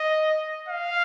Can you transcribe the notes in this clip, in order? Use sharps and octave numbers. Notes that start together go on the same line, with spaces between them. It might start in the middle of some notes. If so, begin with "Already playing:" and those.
Already playing: D#5
F5